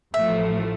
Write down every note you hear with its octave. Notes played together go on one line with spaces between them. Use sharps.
A1 A2 F3 A3 E5